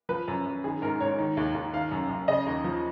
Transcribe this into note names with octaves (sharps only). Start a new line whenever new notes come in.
F3 B4
F#2
F#2
D#3 G#4
G#2 A#4
G#2 C#5
D#3
D#2
D#2
D#3 F5
F#2
F#2
C#3 D#5
D#2
F3